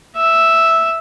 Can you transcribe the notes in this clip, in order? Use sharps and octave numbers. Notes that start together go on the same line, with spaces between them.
E5